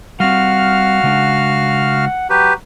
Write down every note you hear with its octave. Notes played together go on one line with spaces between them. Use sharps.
G3 C4 F#4 F5 F#5 F6
C#3 G#3 D4
F#3 G4 B4